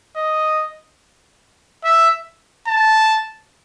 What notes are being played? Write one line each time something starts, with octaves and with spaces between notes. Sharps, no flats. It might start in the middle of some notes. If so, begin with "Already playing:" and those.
D#5
E5
A5